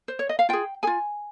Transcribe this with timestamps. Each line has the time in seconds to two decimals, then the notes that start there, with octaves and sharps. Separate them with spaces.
0.08 C5
0.19 C#5
0.29 D#5
0.39 F5
0.49 F4 G#4 G5
0.83 G#4 G#5
0.87 F4